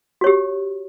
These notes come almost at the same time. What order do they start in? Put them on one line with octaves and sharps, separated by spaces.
F#4 C#5 G4